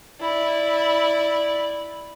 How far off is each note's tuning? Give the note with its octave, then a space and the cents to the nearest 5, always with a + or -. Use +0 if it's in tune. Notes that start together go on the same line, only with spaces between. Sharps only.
E4 -5 D5 +0